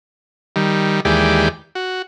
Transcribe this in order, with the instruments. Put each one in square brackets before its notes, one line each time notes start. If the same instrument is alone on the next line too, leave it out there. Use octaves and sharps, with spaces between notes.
[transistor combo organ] D#3 G3
D#2 E3 G#3 G4 D5
F#4